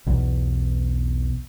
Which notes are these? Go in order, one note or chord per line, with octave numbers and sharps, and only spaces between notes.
B1 E2 B2